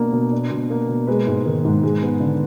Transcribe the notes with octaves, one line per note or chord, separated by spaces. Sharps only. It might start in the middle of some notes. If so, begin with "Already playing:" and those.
Already playing: B2 A#3 D4
B2
D4
B2
A#3
B2
G#3 B4
G#2
D#3
G#2
G#3
B3
D3